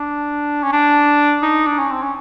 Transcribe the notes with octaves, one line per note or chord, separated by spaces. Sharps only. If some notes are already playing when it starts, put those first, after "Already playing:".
Already playing: D4
C#4
D4
D#4
D4
C#4
C4
C#4